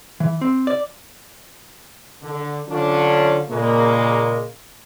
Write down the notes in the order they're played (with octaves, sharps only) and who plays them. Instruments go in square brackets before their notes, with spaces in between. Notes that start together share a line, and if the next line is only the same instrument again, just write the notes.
[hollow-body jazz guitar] E3
C4
D5
[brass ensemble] D3
D3 F#3 C#4 D4 F4
A#2 C#3 G#3 A#3